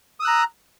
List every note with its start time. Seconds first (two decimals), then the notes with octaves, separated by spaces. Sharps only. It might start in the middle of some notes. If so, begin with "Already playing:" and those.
0.20 D#6
0.22 E6
0.25 F#6
0.28 A#5